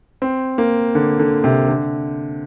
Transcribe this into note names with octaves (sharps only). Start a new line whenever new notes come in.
C4
A#3
D3
D3
C3
D3